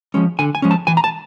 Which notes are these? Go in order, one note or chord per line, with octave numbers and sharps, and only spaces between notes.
F3 G#3 C#4
D3 G#5
G#5
F3 G#3 C#4
A5
E3 G#5
A#5
A5